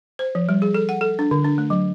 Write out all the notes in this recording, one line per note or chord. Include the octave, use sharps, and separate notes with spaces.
C5
F3
G3
G#4
A4
F#5
A4
D4
D3
D4
A3
F#3